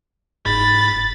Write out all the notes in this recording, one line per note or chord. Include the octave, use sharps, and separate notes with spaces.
F#1 G#2 B5 A6